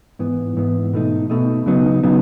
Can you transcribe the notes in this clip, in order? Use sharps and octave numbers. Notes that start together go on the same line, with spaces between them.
G#2 E3 B3
G#2 E3 B3
B2 A3 D#4
B2 A3 D#4
C#3 F#3 B3 D#4
C#3 F#3 B3 D#4